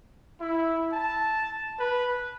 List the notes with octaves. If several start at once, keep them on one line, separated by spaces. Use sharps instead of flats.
E4
A5
B4